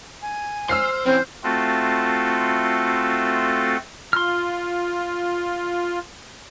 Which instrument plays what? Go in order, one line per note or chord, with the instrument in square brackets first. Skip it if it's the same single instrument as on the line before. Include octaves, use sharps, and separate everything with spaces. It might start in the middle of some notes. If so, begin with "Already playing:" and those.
[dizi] G#5
[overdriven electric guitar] C5 [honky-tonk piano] E6 F6 C7
[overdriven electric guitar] E3 C#4 [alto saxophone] C4 [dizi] C5
[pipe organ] A3 C4 F4 F#4 A4
[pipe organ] F4 [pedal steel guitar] C6 F6